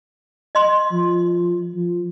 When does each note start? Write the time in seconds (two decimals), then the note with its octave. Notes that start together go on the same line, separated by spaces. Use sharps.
0.55 D#5 C6
0.92 F3
1.75 F3